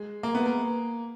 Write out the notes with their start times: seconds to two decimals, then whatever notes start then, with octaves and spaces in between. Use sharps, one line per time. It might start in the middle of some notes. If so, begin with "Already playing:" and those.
Already playing: G#3
0.23 A#3
0.35 B3
0.46 A#3